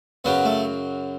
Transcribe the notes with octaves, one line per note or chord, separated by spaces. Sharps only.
F#2 C#3 F#3 B3
A3